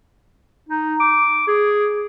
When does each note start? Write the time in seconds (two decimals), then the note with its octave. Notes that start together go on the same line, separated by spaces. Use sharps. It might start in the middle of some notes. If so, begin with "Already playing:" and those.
0.69 D#4
1.00 D6
1.47 G#4